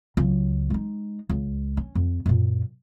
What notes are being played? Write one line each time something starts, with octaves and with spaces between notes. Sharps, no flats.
C#2 F#3
G#3 D#4
C#2
C#4
F2
F#2 A#2